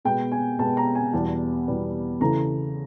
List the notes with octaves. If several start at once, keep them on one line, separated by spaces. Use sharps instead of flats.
B2 G#3 B3 G5
G#5
B2 G#3 B3 A5
A#5
G#5
E2 B2 G3 B3 A5
E2 B2 G3 B3
C#3 E3 A3 A#5